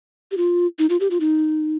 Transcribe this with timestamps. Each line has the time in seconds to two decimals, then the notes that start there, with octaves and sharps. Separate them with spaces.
0.31 G4
0.37 F4
0.79 D#4
0.90 F4
1.00 G4
1.11 F4
1.20 D#4